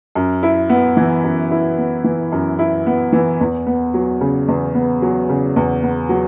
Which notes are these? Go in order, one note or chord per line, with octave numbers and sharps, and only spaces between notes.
F#2
E4
B3
E3
F#2
E4
B3
E3
F#2
E4
B3
E3
E2
B3
F#3
C#3
E2
B3
F#3
C#3
E2
B3
F#3